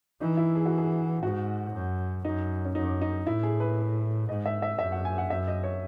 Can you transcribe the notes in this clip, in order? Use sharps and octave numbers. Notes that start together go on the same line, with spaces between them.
E3 D#4
E4
G#4
F#4
G#4
G#2 F#4
F#2
F#2 D#4
C#4
F#2 D#4
D#4
A2 E4
G#4
B4
G#2 D#5
E5
E5
F#2 E5
F#5
G#5
F#5
F#2 E5
D#5
C#5